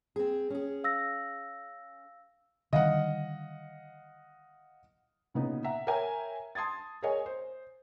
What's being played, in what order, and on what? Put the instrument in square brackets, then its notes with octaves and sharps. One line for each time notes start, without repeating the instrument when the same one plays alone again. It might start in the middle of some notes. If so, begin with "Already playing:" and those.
[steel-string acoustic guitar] C4 G#4
C#4 G#4
[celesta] F5 E6 A#6
[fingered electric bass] D3 D#3 G3 [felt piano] D#5 F5 F#5
[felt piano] A#2 C#3 B3 D#4
E5 F#5 A#5
A#4 C#5 E5 G5 G#5 A#5
A5 C6 D#6 G#6 A6
G#4 A#4 C#5 D#5 G#5
C5